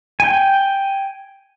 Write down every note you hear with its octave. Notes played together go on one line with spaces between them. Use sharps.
G5 G#5